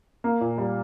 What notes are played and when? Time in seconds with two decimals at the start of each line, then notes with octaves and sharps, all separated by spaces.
0.24 A#3
0.41 A#2
0.58 G3